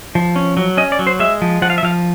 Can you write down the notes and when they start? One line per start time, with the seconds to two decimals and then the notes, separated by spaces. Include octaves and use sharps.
0.15 F3
0.36 C#4
0.57 F#3
0.77 C#4 D#5
0.92 D5
0.99 F#3
1.07 C5
1.20 G#3 E5
1.42 F3
1.62 F3 F#5
1.70 F5
1.78 E5
1.83 F3 F5